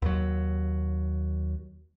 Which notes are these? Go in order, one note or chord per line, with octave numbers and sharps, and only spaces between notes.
D#2 F#3